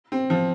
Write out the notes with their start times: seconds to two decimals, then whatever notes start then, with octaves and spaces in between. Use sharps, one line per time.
0.12 C4
0.30 F3